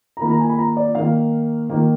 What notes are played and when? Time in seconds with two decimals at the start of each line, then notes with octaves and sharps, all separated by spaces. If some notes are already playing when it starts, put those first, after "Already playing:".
0.17 A#5
0.21 D#3 A#3 B5
0.31 A#5
0.40 G#5
0.50 B5
0.59 A#5
0.77 D5
0.95 D#3 A#3 F5
1.69 D#3 A#3